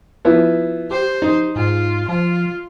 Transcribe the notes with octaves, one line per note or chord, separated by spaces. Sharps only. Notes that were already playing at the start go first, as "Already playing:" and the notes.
F3 B3 E4
G4 C5
D#4
G#2 F4
F3 F4